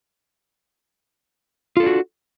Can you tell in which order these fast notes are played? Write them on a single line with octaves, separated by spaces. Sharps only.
F4 A4 D4 F#4